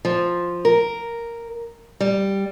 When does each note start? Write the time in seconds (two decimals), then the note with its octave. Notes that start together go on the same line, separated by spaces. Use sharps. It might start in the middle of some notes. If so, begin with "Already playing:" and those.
0.05 F3
0.65 A#4
2.00 G3